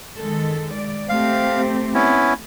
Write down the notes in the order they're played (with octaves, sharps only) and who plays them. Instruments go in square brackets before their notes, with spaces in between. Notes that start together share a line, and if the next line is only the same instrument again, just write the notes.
[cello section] D#3 G#3 A4
D5
[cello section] A3 C4 G4 [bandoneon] F5
[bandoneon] B3 C#4 E4